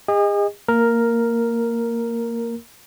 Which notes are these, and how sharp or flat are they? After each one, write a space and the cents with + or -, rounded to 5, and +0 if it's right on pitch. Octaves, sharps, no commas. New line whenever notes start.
G#4 -40 D#5 +0
A#3 -15 A#4 +0